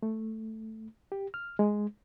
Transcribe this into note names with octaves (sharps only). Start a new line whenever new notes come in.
A3
G4
F6
G#3